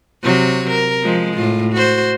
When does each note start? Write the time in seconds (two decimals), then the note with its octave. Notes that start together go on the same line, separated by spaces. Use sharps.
0.24 C3 F#3 C#5
0.70 A#4
1.03 F3 G#3
1.34 A2 F4
1.73 F#4 C5